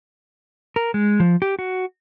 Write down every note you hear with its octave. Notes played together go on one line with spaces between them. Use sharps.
A#4
G#3
F3
G4
F#4